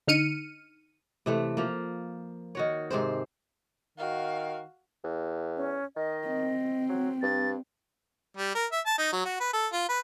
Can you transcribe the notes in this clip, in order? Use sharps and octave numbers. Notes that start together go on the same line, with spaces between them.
D3 D#4 F6 C#7 D#7
C3 E3 A3
F3 A#3
D#3 F#4 C#5
G#2 C3 C4 C5
D#3 F#4 F5
E2
C#4
D#3 D#5
C4
F#3
G2 A6
G3
A#4
E5
A5
D#4
F#3
F#4
B4
A4
F4
B4